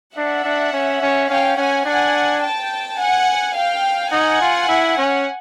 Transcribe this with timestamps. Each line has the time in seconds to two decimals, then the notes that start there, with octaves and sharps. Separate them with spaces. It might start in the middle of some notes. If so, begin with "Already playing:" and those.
0.16 D4 E5 F#5
0.44 D4
0.73 C#4
1.02 C#4
1.29 C#4 F5 G5
1.57 C#4 F#5 G#5
1.85 D4 F#5 G#5
2.42 G5 A5
2.99 F#5 G#5
3.56 F5 G5
4.11 D#4 F#5 G#5
4.41 F4
4.68 E4
4.97 C#4